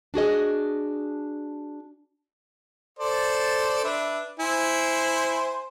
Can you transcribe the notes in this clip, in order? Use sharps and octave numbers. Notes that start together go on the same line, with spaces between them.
D4 F#4 G#4 D#5
A4 C5 D5
D4 B4 E5
E4 C5 G#5